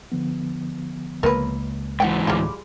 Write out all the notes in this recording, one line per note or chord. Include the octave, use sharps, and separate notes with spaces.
D3 F3 B3
C#2 A#3 A#4 B4
G#2 E3 F#5 G5
D2 A2 G3 G#3 F4 B5 D6